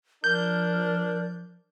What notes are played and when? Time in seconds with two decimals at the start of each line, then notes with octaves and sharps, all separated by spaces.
0.24 F3 D4 A#4 G6